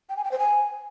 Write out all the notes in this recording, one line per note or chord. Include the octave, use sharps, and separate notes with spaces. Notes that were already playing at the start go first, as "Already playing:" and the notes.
G5
G#5
G5
C5
G#5